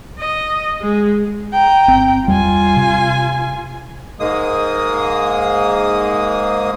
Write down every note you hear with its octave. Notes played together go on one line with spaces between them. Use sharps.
D#5
G#3
G5 A#5
G1 C4
E2 G3 F4 G#5
C3
G#2 G#3 A#3 D#6